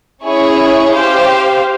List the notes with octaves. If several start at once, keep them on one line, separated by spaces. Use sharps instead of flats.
C#4 E4 G#4 C#5
G4 C5 F5